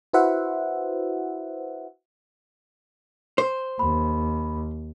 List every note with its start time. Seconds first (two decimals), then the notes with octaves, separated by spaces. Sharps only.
0.13 E4 F#4 B4 C5 E5 F#5
3.38 C5
3.79 D#2 B5